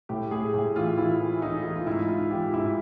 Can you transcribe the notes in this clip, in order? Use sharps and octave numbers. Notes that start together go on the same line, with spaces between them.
A2 G4
A2 G#4
A2 G4
E3 F4
E3 E4
E3
E3 D#4
E3
F4
G#2 E4
G#2 F4
E3 G4
G#2 E4